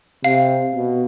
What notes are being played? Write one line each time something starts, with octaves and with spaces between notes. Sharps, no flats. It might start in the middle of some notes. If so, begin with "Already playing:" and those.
C3 F5
B2